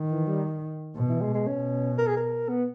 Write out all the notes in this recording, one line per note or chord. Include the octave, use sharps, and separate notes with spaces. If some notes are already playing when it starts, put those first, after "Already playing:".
Already playing: D#3
E3
G3
B2
E3
G#3
G#3
B2 C#4
A#4
G#4
A#4
B3